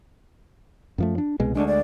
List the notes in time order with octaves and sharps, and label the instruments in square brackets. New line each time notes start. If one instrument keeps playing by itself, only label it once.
[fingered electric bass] F#2 F3 A3
D4
C2 B2 G#3
[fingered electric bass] D2 G#3 [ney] D4
[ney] D5